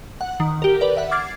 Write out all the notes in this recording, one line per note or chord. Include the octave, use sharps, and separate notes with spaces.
F#5
D#3
G4 A#4
A#4 B4 D5
E5 F#5
D6 F6 G#6 A6 C7